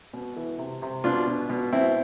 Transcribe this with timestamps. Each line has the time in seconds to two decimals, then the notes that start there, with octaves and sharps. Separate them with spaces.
0.14 B2
0.36 E3
0.59 C3
0.82 C3
1.04 B2 D4 F4
1.27 B2
1.50 B2
1.72 B2 C4 E4